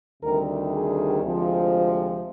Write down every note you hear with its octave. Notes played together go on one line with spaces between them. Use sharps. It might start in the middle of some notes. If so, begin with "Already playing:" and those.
D2 C3 D#3 G3 A#4
G#4
D2 C3 F3 G#3